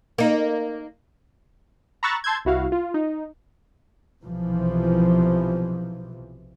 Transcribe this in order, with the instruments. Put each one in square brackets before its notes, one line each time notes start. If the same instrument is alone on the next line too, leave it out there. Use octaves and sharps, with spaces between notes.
[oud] A#3 D#4
[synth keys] A#5 B5 C#6 E6 F#6 A6
A5 C6 E6 G6 G#6
C2 E4 F#4 F5
F4
D#4
[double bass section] B1 C3 E3 F3